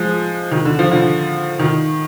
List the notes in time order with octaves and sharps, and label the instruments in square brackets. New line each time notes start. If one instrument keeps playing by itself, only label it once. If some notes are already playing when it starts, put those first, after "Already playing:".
Already playing: [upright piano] F3 G#3
D#3
D3
F3
D3
D#3